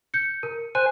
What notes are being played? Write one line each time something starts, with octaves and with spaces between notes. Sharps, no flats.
G6 C#7
A#4
C5 G#5 F#6